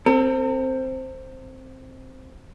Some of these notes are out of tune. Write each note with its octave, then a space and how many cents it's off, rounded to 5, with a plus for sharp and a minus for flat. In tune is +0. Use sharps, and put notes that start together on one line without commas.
C4 +0 A4 +45